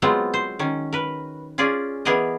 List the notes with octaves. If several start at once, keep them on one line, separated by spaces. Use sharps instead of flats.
F#3 G#3 B3 C4 F4
C5
D#3 C#4
A#4 B4
C#4 F4 G#4 D5
E3 B3 G#4 A#4 D5 D#5